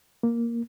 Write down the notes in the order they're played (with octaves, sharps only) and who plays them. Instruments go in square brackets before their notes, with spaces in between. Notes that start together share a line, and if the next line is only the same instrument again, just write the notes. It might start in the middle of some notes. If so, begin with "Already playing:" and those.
[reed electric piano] A#3